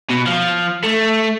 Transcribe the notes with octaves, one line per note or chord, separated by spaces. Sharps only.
B2
F3
A3